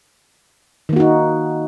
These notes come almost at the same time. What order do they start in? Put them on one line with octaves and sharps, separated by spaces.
D#3 A#3 F#4 D#4